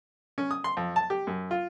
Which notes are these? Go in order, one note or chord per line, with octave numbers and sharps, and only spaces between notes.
C#4
D#6
C6
F2
A5
G4
F#2
F4